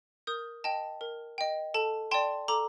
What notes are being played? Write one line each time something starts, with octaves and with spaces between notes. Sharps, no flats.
A#4 D#6 G6
D#5 G5 A5
A#4
D#5 G5
A4 A5
D5 G5 A5 C6
A4 A#5 D6